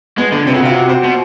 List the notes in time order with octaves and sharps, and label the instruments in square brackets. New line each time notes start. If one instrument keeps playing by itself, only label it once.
[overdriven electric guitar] G#3 [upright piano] B3
[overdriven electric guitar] D3 [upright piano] B3
[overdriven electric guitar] C3 [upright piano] C4
[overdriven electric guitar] C#3 [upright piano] F#4
[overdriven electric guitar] C3 [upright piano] F4
[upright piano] F#4
C5
[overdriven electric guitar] B2